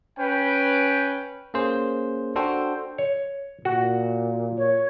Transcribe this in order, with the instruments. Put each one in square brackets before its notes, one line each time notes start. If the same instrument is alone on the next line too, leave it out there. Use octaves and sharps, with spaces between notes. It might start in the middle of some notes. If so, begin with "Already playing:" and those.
[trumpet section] C#4 B4 G5
[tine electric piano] A#3 C#4 G#4 C5
D4 F#4 A4 C5 G5
[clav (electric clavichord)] C#5
[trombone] A#2 [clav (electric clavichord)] F#4
[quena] C#5